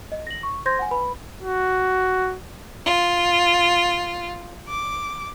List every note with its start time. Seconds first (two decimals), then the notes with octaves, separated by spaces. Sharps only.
0.12 D#5
0.27 A#6 F#7
0.43 C#6
0.66 C5 C6 G6 G#6 A#6
0.79 F#5 G#5
0.91 B4 B5
1.42 F#4
2.85 F4
4.69 D6